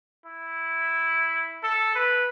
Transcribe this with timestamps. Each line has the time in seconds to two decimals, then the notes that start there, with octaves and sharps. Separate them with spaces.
0.26 E4
1.63 A4
1.95 B4